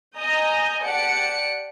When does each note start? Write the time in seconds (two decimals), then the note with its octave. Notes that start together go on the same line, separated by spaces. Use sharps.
0.15 D#5 G#5 A#5 D#6 G6 A#6
0.81 G4 D5 F#5 A5 C#7 D7